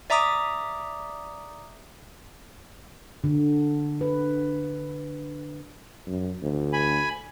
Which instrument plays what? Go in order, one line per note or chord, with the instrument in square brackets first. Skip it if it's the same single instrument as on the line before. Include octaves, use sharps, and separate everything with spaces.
[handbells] D5 E5 A#5 D6 D#6
[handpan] D3
B4
[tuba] F#2
D2
[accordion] G#5 B5